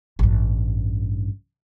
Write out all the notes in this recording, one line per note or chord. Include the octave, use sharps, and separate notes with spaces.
A1 G2